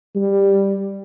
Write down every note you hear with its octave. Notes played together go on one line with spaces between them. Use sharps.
G3